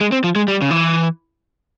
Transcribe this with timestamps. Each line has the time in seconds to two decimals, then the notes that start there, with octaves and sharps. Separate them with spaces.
0.01 G#3
0.12 C4
0.24 F3
0.36 G#3
0.48 G3
0.62 C#3
0.71 E3